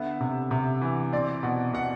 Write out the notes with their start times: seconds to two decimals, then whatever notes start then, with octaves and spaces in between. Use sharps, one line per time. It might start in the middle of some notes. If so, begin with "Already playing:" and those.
Already playing: D3 B3 E5
0.21 C3
0.51 C3
0.81 E3
1.12 C4 D5
1.43 B2
1.73 B2 F#5